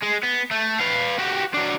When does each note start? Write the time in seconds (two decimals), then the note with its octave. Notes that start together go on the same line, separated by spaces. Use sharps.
0.03 G#3
0.23 B3
0.51 A3
0.80 B4 F5
1.18 F#4 G4
1.54 F#3 D4